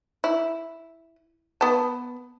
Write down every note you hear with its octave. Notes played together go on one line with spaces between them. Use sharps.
E4
B3 A5